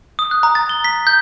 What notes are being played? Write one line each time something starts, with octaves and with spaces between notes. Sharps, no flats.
D#6
F#6
A#5
A6
G7
B6
G6